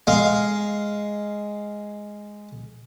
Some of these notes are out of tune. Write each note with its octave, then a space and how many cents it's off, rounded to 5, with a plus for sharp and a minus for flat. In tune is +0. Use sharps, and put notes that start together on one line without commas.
G#3 +0 F5 +0